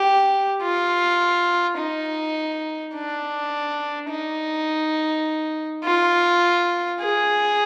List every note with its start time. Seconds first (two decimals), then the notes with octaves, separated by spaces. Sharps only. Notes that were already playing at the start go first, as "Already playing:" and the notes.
Already playing: G4
0.62 F4
1.78 D#4
2.94 D4
4.10 D#4
5.84 F4
7.01 G#4